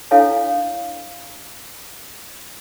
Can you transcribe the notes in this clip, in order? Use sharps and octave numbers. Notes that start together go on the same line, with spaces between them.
D4 E4 A4 C#5 F5 G#5